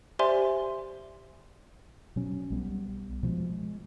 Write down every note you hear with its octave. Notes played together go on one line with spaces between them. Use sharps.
G4 C5 D5 E5 G#5 C6
B2 F#3 C#4
B1 G3 B3
B2 F3 G3 G#3
G#3